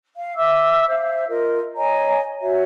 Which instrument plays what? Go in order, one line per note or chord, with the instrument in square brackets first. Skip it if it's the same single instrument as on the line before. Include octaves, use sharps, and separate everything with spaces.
[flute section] F5
E5 D6 E6
C5 E5 F5
F4 A#4 D#5
C#5 D#5 G#5 A#5
F#4 C#5 E5